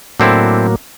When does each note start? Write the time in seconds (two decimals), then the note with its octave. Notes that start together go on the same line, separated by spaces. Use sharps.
0.20 A2 D3 F#3 A#3 C4 E4